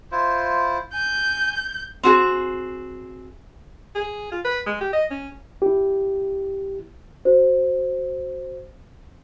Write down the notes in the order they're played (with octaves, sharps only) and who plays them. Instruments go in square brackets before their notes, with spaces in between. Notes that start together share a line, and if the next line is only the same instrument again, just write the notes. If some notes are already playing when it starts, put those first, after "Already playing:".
[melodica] E4 F4 C5
[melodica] G#5 [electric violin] G6
[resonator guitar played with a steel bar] C4 F#4 G#4
[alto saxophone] G#4
F4
B4
G#3
G4
D#5
C#4
[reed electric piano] E4 G4
[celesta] F#4 C5